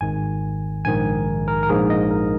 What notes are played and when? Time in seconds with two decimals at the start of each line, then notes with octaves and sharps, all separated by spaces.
0.01 G#1 G#2 D#3 G#5
0.85 A#1 G#2 D#3 G#5
1.48 A#4
1.63 A#4
1.69 A#1 G#2 F3 A#3 D#4 G#4
1.90 D#5
2.11 A#4